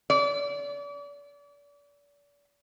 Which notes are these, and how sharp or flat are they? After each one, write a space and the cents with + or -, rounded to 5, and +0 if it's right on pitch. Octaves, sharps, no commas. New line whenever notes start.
D5 -35